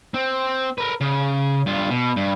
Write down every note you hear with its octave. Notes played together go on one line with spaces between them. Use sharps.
C4
A#4 B4
C#3
G2 F4
B2
G2